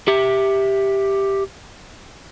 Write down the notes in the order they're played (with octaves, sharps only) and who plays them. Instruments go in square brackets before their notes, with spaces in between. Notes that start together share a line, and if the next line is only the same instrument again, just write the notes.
[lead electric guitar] G4 E5